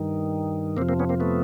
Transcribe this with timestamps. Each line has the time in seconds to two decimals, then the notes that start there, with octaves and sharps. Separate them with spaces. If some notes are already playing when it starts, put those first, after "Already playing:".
Already playing: G2 D#3
0.77 F2 C3 F3 A#3 C4
0.89 A#3 C4
1.00 B3 C#4
1.09 A#3 C4
1.20 A3 B3